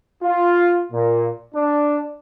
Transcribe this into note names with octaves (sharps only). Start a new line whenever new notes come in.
F4
A#2
D4